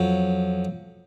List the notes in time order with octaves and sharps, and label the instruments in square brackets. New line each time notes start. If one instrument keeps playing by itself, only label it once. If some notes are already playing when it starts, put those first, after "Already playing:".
Already playing: [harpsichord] F2 F#3